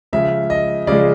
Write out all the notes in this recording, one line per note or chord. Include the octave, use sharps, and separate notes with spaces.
C#3 F3 G#3 E5
D#5
C#3 F3 G#3 D5